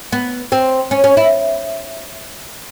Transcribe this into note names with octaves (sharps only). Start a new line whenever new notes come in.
B3
C4
C#4
C#4
E4